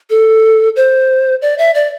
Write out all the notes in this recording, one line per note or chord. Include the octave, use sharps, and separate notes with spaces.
A4
C5
D5
E5
D5